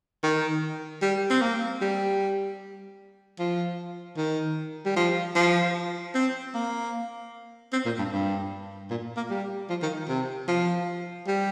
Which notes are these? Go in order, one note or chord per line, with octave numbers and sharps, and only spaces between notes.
D#3
G3
C4
A#3
G3
F3
D#3
G3
F3
F3
C4
A#3
C4
A#2
G2
G2
A#2
A#3
G3
F3
D#3
C3
F3
G3